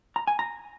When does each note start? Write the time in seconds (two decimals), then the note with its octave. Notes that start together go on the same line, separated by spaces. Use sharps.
0.16 A#5
0.27 G#5
0.39 A#5